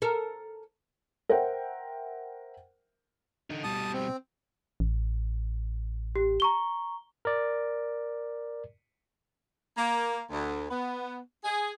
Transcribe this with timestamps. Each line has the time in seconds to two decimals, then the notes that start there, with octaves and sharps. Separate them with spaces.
0.02 A4 A#4
1.29 A#4 C5 E5 F#5 G5
3.50 D3 D#4
3.64 B2 G3 A5 D#6
3.93 C4
4.80 A1
6.16 G4
6.40 A#5 C#6 G7
7.25 A#4 D5
9.76 A#3
10.31 D2
10.70 B3
11.44 G#4